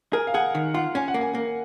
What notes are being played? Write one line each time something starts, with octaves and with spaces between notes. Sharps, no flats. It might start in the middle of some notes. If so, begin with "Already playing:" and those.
G#4 A#4
F5
G#4 F#5
D#3
F4 F#5
C#4 G#5
F#5
A#3
G#5
A#3